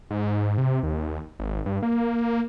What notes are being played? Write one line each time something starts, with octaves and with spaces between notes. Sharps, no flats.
G#2
C3
D#2
G#1
G2
A#3